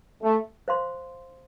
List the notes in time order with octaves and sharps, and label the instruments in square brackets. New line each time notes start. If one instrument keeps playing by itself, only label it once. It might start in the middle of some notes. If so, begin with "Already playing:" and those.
[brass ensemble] A3
[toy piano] C5 F5 C6